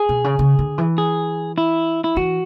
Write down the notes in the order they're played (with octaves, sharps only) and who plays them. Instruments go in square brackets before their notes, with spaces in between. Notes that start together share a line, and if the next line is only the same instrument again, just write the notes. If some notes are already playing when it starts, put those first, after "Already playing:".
Already playing: [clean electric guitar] G#4
[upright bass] B2
C#3
C#3
D3
E3
[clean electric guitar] G#4
E4
E4
[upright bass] E3 [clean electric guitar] F#4